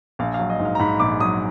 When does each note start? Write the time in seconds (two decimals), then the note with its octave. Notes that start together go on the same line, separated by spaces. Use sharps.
0.19 A#1 F5
0.34 F5
0.39 F#3
0.50 D#5
0.59 G#2
0.65 F5
0.75 A#5
0.79 G#2 B5
1.00 A#1 D6
1.20 F#3 D#6